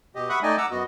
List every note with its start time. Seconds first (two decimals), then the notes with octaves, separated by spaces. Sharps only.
0.15 B2 G4 D#5
0.29 E5 F#5 B5 C#6 D#6 F#6
0.43 A3 D#4 D5 D#5 G5 G#5
0.58 F#5 A#5 D6 E6
0.71 F#2 B3 F#4 D#5